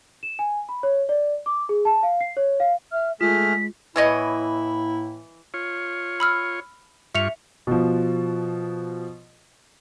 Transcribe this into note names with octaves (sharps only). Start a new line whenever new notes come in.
E7
G#5
B5
C#5
D5
D6
G#4
A5
F5
C7
C#5
F5
E5 F6
G#3 A3 F4 G#4 F6 B6
A2 E3 A#3 E4 C#5 D#5
F4 C#5
B5 E6 F6
G2 F4 E5 C#6 C#7 F7
B2 F3